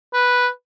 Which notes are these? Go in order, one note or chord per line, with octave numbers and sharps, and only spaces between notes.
B4